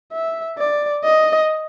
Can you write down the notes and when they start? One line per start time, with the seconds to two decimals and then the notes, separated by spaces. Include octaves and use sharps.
0.12 E5
0.58 D5
1.05 D#5